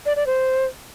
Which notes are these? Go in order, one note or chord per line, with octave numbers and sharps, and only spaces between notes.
D5
D5
C5